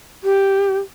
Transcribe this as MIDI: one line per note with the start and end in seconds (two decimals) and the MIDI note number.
0.23 0.77 67